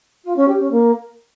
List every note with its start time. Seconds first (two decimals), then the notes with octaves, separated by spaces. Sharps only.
0.24 F4
0.36 C#4
0.47 G4
0.59 C#4
0.71 A#3